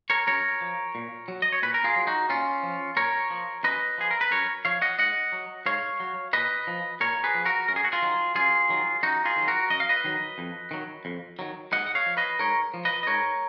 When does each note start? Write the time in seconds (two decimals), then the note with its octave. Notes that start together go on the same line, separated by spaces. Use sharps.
0.10 A#4 C#5
0.27 F#2 A#4 C#5
0.61 F3
0.95 A#2
1.28 F#3
1.42 D#5
1.52 C#5
1.62 A#2 B4
1.74 A#4
1.84 F4 G#4
1.96 F#3
2.07 D#4 F#4
2.29 A#2 C#4 F4
2.63 F3
2.96 A#2 A#4 C#5
3.30 F3
3.63 F#2 B4 D#5
3.98 F3 G#4
4.11 A#4
4.21 B4
4.31 F#2 A#4 C#5
4.65 F3 C#5 F5
4.82 D#5 F#5
4.99 G#2 D#5 F#5
5.32 F#3
5.66 G#2 C#5 F5
6.00 F#3
6.33 A#2 B4 D#5
6.67 F3
7.00 A#2 A#4 C#5
7.24 G#4 B4
7.35 F3
7.45 F#4 A#4
7.68 F#2 A#4
7.76 G#4
7.84 F#4
7.92 F4 G#4
8.02 D#3 F#3
8.36 F#2 F4 G#4
8.69 D#3 F#3
9.03 F#2 D#4 F#4
9.25 F4 G#4
9.36 D#3 F#3
9.48 F#4 A#4
9.70 F#2 D#5
9.80 F5
9.89 B4 D#5
10.04 D#3 F#3
10.38 F2
10.71 D#3 F#3
11.05 F2
11.39 D#3 F#3
11.72 G#2 D#5 F#5
11.87 F#5
11.95 C#5 F5
12.06 F3
12.17 B4 D#5
12.39 G#2 A#4 C#5
12.74 F3
12.85 B4 D#5
13.03 D#5
13.07 G#2 A#4 C#5